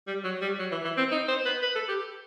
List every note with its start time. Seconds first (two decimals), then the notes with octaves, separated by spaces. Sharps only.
0.07 G3
0.24 F#3
0.42 G3
0.59 F#3
0.72 E3
0.85 E3
0.98 C4
1.11 D#4
1.28 C5
1.46 B4
1.63 B4
1.75 A4
1.89 G4